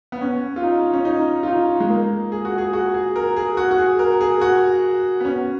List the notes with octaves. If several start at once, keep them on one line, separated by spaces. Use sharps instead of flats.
B3
C#4
F4
D#4
C#4
D#4
F4
D#4
G#3
A#3
G#4
F#4
G#4
F#4
G#4
A#4
G#4
F#4
F#4
G#4
A#4
G#4
F#4
B3
C#4